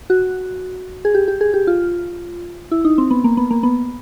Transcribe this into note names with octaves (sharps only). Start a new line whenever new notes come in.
F#4
G#4
G4
G4
G#4
G4
F4
E4
D#4
C4
B3
A#3
B3
A#3
B3